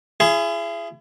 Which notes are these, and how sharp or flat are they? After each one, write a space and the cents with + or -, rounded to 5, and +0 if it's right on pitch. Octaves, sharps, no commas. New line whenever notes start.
E4 +40 G#4 +0